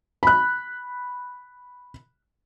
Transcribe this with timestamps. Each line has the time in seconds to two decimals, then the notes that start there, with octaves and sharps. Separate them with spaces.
0.23 B5 F#6